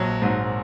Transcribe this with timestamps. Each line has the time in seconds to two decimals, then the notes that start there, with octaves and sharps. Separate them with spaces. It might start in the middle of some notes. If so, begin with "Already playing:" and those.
Already playing: A#1 F#3
0.22 G#2 F#3